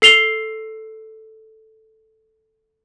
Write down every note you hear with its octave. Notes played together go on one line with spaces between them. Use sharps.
A4 C7 F7 G7